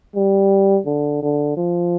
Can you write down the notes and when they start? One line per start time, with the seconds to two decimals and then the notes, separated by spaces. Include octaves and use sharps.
0.16 G3
0.86 D3
1.23 D3
1.57 F3